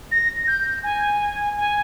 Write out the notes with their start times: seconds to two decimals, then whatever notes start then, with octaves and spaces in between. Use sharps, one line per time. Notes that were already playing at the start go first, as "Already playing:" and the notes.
0.12 A#6
0.48 G6
0.84 G#5
1.58 G#5